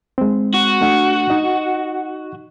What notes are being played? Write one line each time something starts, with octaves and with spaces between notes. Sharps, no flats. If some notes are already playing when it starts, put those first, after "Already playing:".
G#3 C4
F#4
A3 D4 F#5
D#4 D#5